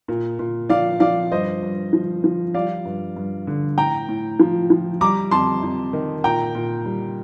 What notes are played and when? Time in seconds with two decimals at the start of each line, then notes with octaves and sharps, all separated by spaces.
0.08 A#2
0.39 A#2
0.70 F3 D5 F5
1.00 F3 D5 F5
1.31 G2 C5 D#5
1.63 G2
1.93 F3
2.24 F3
2.54 G3 D5 F5
2.85 G2
3.16 G2
3.47 D3
3.78 A2 G5 A#5
4.09 A2
4.40 F3
4.70 F3
5.01 G3 A#5 D6
5.31 F2 A5 C6
5.63 F2
5.93 D#3
6.24 A#2 G5 A#5
6.55 A#2
6.86 G3